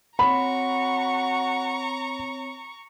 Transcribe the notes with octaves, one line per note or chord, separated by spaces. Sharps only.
C4 F#4 C#5 A#5 B5 C#6